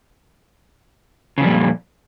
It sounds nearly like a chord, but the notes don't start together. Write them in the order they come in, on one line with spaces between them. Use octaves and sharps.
C#3 F2 G3 A#2